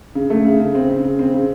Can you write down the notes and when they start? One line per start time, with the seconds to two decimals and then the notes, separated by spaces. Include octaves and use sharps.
0.15 C#3
0.30 A3
0.45 C#3
0.60 C#3
0.75 C4
0.89 C#3
1.04 C#3
1.19 C4
1.34 C#3